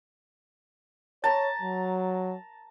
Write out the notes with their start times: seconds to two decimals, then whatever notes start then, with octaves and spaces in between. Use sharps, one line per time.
1.24 C#5 A5 A#5
1.62 F#3